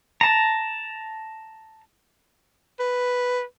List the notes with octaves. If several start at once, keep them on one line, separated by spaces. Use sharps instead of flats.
A5 A#5
B4